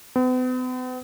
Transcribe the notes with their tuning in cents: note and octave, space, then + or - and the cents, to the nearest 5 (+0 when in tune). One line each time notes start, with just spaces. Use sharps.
B3 +45